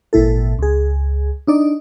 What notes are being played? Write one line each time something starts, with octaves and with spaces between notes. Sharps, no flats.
G#1 A#2 E4 A4
C#2 G#4
D4 D#4 D5